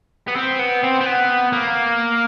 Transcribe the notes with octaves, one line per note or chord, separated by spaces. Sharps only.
B3
C4
B3
C4
C4
B3
A#3